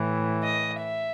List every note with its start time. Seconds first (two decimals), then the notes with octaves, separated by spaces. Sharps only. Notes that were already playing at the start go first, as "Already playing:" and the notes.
Already playing: A2 E3
0.43 D#5
0.82 E5